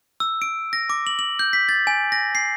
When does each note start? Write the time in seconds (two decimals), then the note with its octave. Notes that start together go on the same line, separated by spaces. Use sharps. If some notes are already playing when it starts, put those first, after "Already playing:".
0.20 E6
0.42 D7
0.73 A#6
0.90 D6
1.07 F#7
1.19 F#7
1.39 G6
1.53 B6
1.69 A6
1.87 G#5
2.12 A#6
2.35 C7